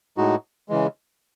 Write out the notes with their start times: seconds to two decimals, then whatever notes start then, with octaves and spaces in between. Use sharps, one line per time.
0.17 A2 G#3 D#4 F#4
0.69 C#3 E3 G#3